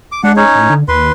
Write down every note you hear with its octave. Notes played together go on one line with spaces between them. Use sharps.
D6
G#3 D4 F#5
C#4 D#4 C#5
A2
D3
D#2 B4 C6